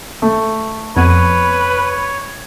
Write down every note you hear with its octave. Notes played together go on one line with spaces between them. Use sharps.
A3
F2 B3 B4 C#5 D#7